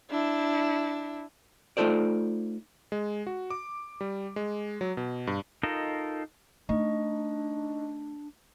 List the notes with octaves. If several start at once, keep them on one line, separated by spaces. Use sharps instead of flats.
D4 E4
A3 D#4 F4 A4 C5 D5
G#3
F#4
D6
G3
G#3
F#3
B2
G2
D#4 F4 A4 A#4 D#5
A3 D4 D#4 D#5 C#6